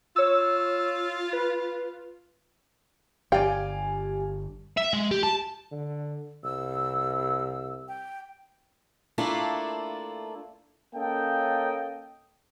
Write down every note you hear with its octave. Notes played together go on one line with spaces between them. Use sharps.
F4 C#5 E6
B4
G1 G4 D5 F5 G5 G#5
E5
G#3
G4
A5
D3
C2 E6
G5
A3 A#3 D4 E4 F4 A4
A#3 C#4 A4 D#5 G5